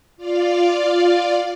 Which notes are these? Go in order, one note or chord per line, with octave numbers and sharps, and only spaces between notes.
F4 D5 F5